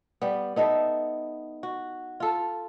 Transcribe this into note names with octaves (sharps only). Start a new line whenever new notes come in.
G3 B3
B3 D#4 A4 E5
F#4
F4 A4